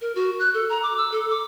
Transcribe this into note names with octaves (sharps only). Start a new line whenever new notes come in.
A#4
F#4
F#6
A4
A#5
D6
E6
A4
D6